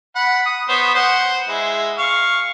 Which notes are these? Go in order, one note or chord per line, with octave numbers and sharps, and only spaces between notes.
F#5 B5
D#6
B3 C5 C#5
C5 F#5
G#3 E4
F5 C#6